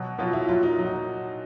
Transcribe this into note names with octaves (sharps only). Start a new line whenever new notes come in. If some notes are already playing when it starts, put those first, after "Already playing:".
Already playing: B2 F#3
B2 F#3 F4
E4
A#2 F#3 F4
D#4
A#2 F#3
D#4